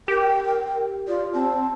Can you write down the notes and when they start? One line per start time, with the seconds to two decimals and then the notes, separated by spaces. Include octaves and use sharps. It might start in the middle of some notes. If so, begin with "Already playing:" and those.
0.08 G4 A#4 G5
1.08 F4 D5
1.34 C4 A5